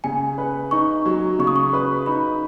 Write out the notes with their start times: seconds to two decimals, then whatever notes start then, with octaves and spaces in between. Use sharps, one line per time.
0.04 C#3 G#5
0.38 B4
0.71 D#4 C#6
1.06 F#3
1.39 C#3 C#6
1.47 D#6
1.56 C#6
1.73 B4
2.06 D#4 B5